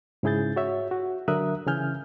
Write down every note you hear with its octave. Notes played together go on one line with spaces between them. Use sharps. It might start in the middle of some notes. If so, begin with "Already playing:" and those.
G#2 C#3 E4 G#4 G6 A6
F#4 C#5 E5
F#4
D3 F#3 A#4 E5 D#6 F#6
C#3 E3 G#5 F6 G6